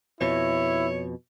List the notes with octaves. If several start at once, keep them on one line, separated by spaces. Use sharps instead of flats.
F2 B2 E4 C#5